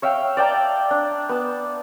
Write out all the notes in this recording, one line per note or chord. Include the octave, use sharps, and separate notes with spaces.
C#5 E5 F5 G5
D5 G5 A5 A#5
D4
B3 A5